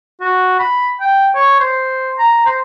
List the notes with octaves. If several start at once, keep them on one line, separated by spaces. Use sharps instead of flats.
F#4
B5
G5
C#5
C5
A#5
C5